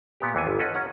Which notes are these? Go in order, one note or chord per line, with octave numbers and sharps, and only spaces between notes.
A#2 B3 G4
D#2 E3 B3 G#5
G1
C#4 A4 B4 D#5 F#5
C#4 F#5 A#5